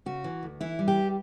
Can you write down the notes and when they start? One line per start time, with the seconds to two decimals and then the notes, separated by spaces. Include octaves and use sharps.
0.06 C#3 F#4
0.24 E3
0.43 D2
0.61 E3 E4
0.79 G3
0.88 G4